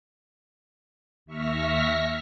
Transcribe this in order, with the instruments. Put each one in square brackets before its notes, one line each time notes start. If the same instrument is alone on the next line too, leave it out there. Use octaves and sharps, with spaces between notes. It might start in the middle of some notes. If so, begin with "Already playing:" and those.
[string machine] D#2 E5 C#6 F6 A#6 B6